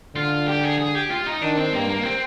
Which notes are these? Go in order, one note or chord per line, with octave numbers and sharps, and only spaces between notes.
D3 F4
G4
G#4
G#4
G4
F4
D#4
D#3 D4
C4
G2 A#3
A#3
C4